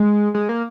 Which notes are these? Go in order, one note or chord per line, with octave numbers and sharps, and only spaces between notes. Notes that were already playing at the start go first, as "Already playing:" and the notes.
Already playing: G#3
G#3
A#3